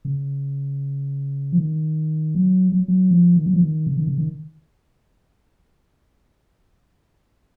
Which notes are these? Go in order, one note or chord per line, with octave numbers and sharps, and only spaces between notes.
C#3
F3
D#3
F#3
F#3
F#3
F3
D#3
F#3
F3
D#3
C#3
D#3
C#3
D#3